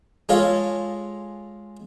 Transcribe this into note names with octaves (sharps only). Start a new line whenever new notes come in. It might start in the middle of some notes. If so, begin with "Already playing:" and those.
G#3 F4 A4 C#5 D#5 F5